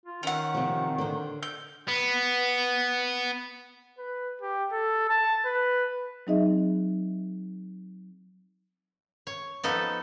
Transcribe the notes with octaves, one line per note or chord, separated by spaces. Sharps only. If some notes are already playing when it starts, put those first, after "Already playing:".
F4
D#3 C#4 F#5
C3 F3
D3 C5
G6
B3
B4
G4
A4
A5
B4
F#3 C4 D#4 G#4 D#5 E5
C#5
F3 B3 D#4 A4